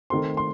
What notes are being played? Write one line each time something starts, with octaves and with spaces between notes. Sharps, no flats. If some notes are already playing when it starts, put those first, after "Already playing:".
D#3 A3 C4 C6
C6